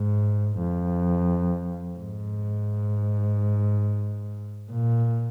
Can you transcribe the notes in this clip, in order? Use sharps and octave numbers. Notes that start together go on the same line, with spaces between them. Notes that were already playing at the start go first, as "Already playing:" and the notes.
Already playing: G#2
F2
G#2
A#2